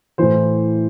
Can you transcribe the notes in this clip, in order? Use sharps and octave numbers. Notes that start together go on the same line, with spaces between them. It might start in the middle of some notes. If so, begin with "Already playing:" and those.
A2 E3 C5